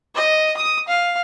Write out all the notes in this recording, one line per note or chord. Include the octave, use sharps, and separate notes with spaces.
D#5
D#6
F5